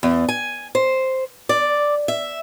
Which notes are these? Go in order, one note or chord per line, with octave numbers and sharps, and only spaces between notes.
E2
G#5
C5
D5
E5